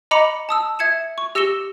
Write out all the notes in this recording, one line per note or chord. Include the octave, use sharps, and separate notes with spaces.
D#5 A#5 B5 D6 C#7 F7
A5 D#6 E6
E5 G#6 C#7 E7
C#6
G4 E6 A#6 C#7 E7 G7